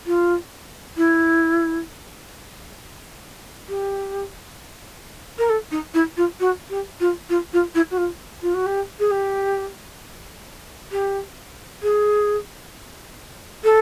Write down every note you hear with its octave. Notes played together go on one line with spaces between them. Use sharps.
F4
E4
G4
A#4
A4
D#4
E4
F4
F#4
G4
F4
F4
F4
E4
F#4
F4
F4
F#4
G4
G#4
G4
G4
G#4
A4